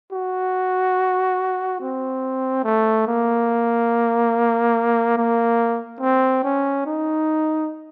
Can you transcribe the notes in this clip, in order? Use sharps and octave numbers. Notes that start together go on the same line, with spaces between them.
F#4
C4
A3
A#3
A#3
C4
C#4
D#4